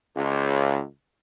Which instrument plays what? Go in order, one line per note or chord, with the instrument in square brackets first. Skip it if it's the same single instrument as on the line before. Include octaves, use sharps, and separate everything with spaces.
[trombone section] C#2